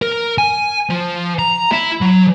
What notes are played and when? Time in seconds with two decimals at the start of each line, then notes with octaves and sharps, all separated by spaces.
0.02 A#4
0.38 G#5
0.90 F3
1.39 A#5
1.72 E4
2.02 F#3